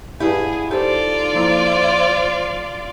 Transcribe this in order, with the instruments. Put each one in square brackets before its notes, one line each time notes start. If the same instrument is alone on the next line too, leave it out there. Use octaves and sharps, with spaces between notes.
[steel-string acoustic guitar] G2 B3 E4 [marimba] G4 [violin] G#4
[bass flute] D#4 [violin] F4 D5 [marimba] G4 C5 [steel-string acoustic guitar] A4
[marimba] F3 A#3 E4 [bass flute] C5